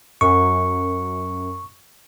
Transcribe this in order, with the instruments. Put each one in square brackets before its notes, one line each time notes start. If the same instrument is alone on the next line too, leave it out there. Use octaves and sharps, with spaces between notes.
[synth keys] F#2 [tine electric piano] C#6